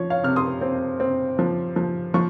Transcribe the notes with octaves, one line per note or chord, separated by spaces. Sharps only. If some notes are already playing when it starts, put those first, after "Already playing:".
Already playing: F3 C#5
C#5 F5
C3 F6
C6 D#6
C4
C4
F3
F3
F3 C#6